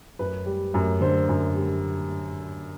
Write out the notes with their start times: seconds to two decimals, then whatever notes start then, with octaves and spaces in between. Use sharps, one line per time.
0.19 F#2 B4
0.46 G3
0.74 F#2
1.01 D3 C5
1.29 F#2
1.55 G3